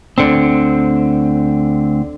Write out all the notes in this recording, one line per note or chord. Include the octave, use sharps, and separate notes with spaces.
D2 D3 C4